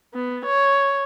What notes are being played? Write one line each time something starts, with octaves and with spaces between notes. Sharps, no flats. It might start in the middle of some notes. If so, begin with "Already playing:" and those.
B3
C#5